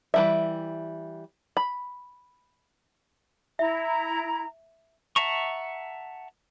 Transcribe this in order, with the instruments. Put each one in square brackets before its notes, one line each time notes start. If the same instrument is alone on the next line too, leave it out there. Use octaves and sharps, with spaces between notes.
[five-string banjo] E3 G3 E5
B5
[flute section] E4 A#5 [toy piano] E5
[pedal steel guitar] E5 F#5 A5 A#5 C#6